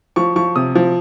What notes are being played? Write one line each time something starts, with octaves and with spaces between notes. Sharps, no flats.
F3 C#6
F3 C#6
C3 D#6
F3